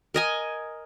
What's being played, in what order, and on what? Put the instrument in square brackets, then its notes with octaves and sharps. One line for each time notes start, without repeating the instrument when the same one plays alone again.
[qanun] A#4 D#5 G#5